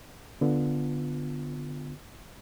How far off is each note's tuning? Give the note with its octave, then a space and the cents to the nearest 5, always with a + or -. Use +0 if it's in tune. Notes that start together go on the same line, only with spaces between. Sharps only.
D3 +0 B3 +0 F4 +0